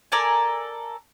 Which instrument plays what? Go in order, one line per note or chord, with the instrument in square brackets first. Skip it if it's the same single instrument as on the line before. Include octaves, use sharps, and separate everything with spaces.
[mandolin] A4 A#4 D5 G#5